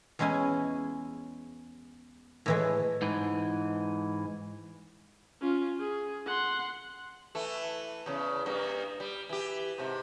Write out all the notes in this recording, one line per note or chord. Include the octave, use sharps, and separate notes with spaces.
E2 G#3 C#4 E4 G#5
A2 E3 G#3
G#2 E3
C#4 F4
G#4
F#5 C6
E3 A3
E2 C#3
G2 A#3
G3
E3 G4
G#2 C3